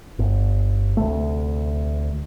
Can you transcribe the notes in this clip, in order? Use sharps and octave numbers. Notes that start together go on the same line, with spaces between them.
G1
D2 C3 A3